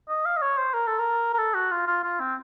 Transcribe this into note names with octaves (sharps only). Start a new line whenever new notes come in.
D#5
F5
D#5
C#5
C5
A#4
A4
A#4
A#4
A4
F#4
F4
F4
F4
C4